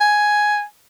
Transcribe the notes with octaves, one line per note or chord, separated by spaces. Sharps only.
G#5